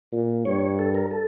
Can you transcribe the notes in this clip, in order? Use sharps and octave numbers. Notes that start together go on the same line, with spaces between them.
A#2
G2 C#5
A4
A#4
A4